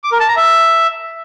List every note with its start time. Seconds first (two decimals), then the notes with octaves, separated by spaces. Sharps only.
0.04 D6
0.12 A#4
0.20 A5
0.28 A#5
0.36 E5